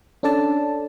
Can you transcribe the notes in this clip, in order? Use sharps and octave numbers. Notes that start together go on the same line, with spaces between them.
C#4 D4 A4 D5 A5